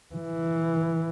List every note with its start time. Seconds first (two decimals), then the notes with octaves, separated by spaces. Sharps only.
0.14 E3